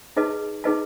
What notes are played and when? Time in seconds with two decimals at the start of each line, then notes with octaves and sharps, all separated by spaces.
0.17 D#4 G#4 B4 D#5 A5
0.64 D#4 G#4 B4 D#5 A5